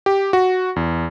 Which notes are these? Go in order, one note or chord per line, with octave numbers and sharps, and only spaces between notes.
G4
F#4
E2